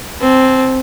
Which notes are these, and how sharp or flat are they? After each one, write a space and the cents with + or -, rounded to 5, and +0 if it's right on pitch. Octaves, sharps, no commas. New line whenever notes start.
C4 +0 A5 -35